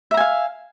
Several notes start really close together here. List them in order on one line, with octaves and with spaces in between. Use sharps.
E5 A#5 G#5 F5